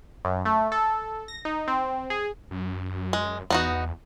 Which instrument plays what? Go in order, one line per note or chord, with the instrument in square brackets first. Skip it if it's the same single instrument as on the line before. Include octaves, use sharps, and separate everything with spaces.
[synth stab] F#2
A3
A4
A#6
D#4
C4
G#4
[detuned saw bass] F#2
[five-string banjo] G#3
[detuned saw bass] E2 [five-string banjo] B3 D#4 F#4